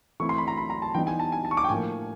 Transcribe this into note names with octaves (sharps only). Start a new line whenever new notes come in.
E3 A3 C4 E4 C#6
C6
B5
A#5
B5
A#5
A5
E3 G3 B3 D#4 G5
G#5
A5
G#5
A5
C#6
D6
G5
A2 F3 A#3 G#5